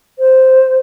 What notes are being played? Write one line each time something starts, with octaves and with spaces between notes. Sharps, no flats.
C5